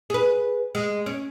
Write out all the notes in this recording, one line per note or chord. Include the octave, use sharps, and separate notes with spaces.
G#4 B4
G#3
C#4